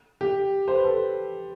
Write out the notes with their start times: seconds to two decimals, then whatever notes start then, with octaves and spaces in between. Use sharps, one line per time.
0.21 G4
0.68 C5
0.76 B4
0.84 A4